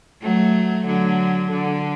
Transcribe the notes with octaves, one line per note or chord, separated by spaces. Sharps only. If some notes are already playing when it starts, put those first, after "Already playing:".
F#3 A3
D3 F#3
D3